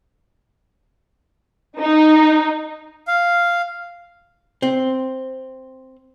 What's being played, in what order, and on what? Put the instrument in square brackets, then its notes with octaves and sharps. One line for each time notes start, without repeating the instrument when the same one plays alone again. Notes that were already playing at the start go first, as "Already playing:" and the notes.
[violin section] D#4
[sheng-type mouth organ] F5
[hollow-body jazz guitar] C4